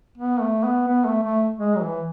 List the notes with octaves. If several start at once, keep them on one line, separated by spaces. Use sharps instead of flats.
B3
A3
B3
B3
A3
A3
G#3
F#3
E3